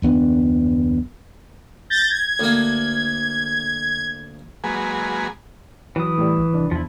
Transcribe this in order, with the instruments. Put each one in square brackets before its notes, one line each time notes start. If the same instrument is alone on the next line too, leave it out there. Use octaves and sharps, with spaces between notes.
[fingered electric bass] F#1 D#2 B3 D4
[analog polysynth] G6 A6 A#6
G#6
[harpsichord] D2 A#3
[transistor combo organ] F#3 G#3 A#3 G#4 B4
[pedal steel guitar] E3 D#6 [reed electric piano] F#3
[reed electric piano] A2 G3
[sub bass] G#1
[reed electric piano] C2 D4
[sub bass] E2 [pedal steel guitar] F3 E4